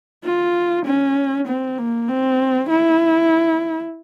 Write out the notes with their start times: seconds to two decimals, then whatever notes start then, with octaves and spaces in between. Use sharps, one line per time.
0.24 F4
0.85 C#4
1.47 C4
1.78 A#3
2.08 C4
2.69 E4